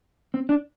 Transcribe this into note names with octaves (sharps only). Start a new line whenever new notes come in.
C4
D4